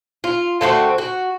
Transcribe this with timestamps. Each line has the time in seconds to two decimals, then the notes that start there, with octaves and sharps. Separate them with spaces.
0.24 F4
0.61 D3 A3 C4 F#4
0.98 F#4